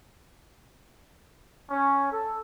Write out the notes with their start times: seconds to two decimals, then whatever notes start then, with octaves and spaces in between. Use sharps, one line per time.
1.70 C#4
2.10 A4